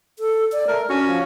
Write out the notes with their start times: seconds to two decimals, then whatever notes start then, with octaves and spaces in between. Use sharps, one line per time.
0.19 A4
0.52 D5
0.68 A3 A#4
0.89 C#4 D4 F#4
1.06 F3